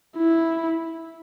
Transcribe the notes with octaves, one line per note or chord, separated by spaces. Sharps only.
E4